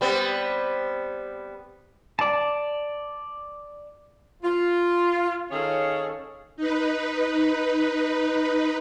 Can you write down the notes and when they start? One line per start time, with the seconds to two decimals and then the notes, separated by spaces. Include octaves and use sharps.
0.01 G3 B3 C4
2.19 D5 A5
4.43 F4
5.51 D#3 C#4 G#4 A4 C#5 F5
6.56 D#4 B4